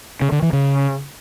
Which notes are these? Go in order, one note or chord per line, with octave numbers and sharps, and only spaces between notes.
C#3
D3
E3
C#3